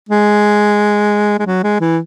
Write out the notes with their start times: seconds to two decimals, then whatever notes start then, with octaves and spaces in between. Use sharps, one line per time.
0.09 G#3
1.39 G#3
1.46 F#3
1.63 G#3
1.80 E3